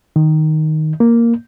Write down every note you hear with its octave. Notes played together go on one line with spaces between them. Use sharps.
D#3
A#3